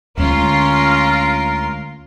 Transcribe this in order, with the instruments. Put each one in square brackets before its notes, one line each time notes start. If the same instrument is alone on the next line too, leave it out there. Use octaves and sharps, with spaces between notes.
[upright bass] D2 G#3 [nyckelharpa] C#4 [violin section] F4 C6 [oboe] A#4